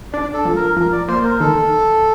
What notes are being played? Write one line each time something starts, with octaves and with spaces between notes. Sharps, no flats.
D4 D5
A4
F3
A#4
F3 A#4
D5
A#3 C5
A#4
D#3 A4